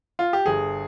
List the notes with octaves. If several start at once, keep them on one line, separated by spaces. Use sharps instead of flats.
F4
G4
G1 G#4